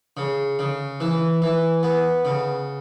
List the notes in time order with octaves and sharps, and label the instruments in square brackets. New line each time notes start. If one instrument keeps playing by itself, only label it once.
[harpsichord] C#3
C#3
E3
E3
B3
C#3